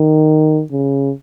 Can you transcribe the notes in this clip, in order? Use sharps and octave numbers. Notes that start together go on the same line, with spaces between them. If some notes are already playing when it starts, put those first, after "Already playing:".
Already playing: D#3
C#3